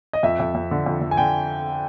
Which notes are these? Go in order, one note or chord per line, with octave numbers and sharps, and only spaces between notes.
D#5
F2 E5
F2
F2
D3
F2
F2
G#5
D3 G5